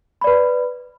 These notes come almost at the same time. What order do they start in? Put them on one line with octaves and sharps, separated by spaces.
B5 D5 B4